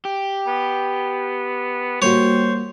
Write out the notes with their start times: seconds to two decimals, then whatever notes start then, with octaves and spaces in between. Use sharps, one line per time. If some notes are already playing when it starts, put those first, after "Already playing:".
0.05 G4
0.47 B3
2.02 G3 A#3 F#4 C5 C#5